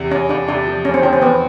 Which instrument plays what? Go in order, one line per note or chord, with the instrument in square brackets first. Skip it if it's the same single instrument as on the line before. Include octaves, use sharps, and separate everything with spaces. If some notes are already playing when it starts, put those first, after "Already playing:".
Already playing: [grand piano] E2 C3
[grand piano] E2 [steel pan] C#4
[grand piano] E2 [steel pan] D4
[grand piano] C3 [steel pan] D4
[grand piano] F3
[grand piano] F1 [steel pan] C#4
[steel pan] C4
[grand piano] F3 [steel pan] C#4
[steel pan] C4
[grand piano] E2 [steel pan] B3